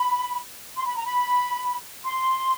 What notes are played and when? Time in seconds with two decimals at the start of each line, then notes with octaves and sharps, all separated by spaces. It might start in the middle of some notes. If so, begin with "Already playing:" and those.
Already playing: B5
0.76 C6
0.87 B5
0.97 A#5
1.06 B5
2.05 C6